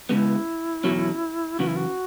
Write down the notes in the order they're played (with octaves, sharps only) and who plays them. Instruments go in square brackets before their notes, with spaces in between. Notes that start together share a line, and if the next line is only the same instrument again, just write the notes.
[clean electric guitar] C#2 C#3 G#3 B3 [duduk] E4
[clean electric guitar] E2 B2 F#3 C#4
[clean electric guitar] F#2 C#3 E3 [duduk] F#4
[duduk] E4
F#4